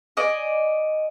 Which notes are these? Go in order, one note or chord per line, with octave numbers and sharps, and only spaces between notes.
D5 D#5 G#5